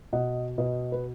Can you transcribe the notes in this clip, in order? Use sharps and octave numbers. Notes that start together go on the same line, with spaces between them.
B2 D#5 F#5
B2 B4 D#5
B4